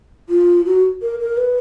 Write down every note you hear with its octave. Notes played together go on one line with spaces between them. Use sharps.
F4
F#4
A#4
A#4
B4